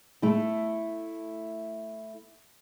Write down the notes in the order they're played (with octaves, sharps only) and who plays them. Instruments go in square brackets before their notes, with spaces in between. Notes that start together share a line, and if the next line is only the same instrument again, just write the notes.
[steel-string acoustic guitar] A3 E4